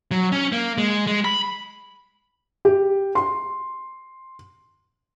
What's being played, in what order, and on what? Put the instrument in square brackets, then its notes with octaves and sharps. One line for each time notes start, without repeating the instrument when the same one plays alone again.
[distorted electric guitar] F#3
C#4
A#3
G#3
G#3
B5
[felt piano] G4
C6